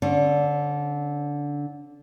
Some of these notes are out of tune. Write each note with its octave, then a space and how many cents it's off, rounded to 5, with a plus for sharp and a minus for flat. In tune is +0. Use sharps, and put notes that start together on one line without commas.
D3 -15 C#4 -45